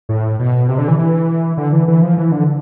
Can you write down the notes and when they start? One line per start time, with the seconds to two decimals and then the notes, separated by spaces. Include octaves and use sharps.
0.09 A2
0.39 B2
0.69 C3
0.78 D3
0.88 E3
0.99 E3
1.57 D3
1.73 E3
1.88 E3
2.02 F3
2.18 E3
2.32 D3